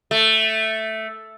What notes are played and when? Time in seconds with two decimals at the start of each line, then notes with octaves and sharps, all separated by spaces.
0.11 A3